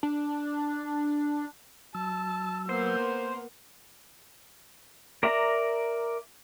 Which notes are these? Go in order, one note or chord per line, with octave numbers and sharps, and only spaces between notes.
D4
F#3 A5 E6
A#3 B3 A#4 C5
A#4 D5 E5 A#5